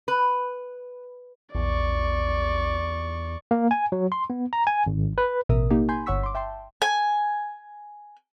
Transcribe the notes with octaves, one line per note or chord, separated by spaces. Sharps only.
B4
A#1 E2 D5 C#6
A#3
G#5
F#3
C6
B3
A#5
G#5
G#1
B4
A1 B2 A#4 E5 D#6
A#3 D#4 G4
G#5 B5 C6 G6
G1 C#5 F#5 C#6 E6 B6
C6 D6
E5 G5 A5 C6
G#5